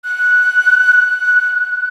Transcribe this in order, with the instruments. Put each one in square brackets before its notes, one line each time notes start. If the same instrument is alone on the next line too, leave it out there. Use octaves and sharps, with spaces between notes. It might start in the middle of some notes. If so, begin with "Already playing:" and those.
[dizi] F#6